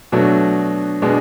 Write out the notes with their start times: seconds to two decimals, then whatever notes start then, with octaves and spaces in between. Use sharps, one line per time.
0.12 B2 F#3 A3 D4
1.02 B2 G#3 D4